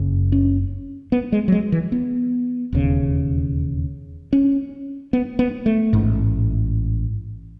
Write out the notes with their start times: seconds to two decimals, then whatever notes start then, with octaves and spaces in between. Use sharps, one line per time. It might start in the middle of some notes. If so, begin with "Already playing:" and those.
Already playing: F#1 F#2 C#3
0.32 C#4
1.12 B3
1.32 G#3
1.48 F#3
1.52 G#3
1.72 E3
1.92 B3
2.73 E1 D#2 C#3
4.33 C#4
5.13 B3
5.39 B3
5.66 A3
5.93 A1 G#2